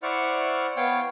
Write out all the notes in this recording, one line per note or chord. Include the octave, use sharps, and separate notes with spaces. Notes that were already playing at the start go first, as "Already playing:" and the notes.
E4 C5 D5 F#5 C#6 F6
B3 C#5 F5 G5